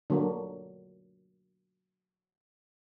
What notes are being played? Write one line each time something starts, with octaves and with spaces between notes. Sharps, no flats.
D3 F#3 A#3